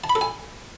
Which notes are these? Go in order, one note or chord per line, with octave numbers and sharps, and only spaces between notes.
A5
B5
A4
G#5